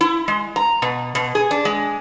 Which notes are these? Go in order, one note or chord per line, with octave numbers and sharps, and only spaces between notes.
E4
G#3
A#5
B2
B2
G#4
D4
G#3